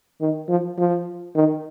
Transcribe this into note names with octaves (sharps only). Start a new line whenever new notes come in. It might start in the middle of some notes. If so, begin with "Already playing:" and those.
D#3
F3
F3
D#3